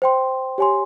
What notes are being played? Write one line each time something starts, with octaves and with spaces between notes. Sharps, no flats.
C5 G5 C6
G4 C#5 G#5 C6